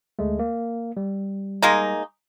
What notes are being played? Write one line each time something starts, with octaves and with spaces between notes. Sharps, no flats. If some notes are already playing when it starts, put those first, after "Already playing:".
D2 G#3 A3
A#3
G3
G#3 A#3 D#4